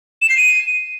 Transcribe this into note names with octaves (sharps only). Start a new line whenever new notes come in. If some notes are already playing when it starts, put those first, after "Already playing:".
E7
C7
D#7